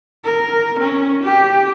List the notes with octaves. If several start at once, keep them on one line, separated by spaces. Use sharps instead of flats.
A#4
C#4
G4